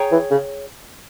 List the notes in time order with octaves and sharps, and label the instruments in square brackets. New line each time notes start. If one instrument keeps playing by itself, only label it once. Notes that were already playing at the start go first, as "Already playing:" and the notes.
Already playing: [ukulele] G#4 C#5 G5 A#5
[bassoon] E3
C#3